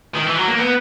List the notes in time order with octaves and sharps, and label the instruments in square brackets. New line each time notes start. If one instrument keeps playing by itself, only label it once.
[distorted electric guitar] D#3
E3
F#3
A#3
B3